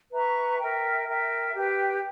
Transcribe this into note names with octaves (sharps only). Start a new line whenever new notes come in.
B4 E5 A#5 C#6
A#4 E5 G5
A#4 E5 G5
G4 B4 G5